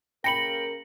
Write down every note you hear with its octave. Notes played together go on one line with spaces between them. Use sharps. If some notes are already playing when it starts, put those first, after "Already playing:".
C#3 A#3 A#4 G5 B5 A#6 C#7 F#7